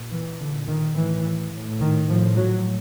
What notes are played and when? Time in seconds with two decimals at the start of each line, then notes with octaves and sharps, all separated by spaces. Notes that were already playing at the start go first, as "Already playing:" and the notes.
Already playing: A#2
0.12 E3
0.40 A#2 D3
0.67 D#3
0.96 A2 E3
1.52 A2
1.80 D#3
2.08 A2 F3
2.36 F#3